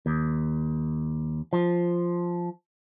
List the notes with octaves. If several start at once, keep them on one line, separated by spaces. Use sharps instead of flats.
D#2
F3